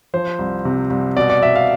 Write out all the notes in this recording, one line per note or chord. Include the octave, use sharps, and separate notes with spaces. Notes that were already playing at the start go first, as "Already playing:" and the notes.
F3 C5
C2
C3
C2
B2 D5
D5
B2 E5
F5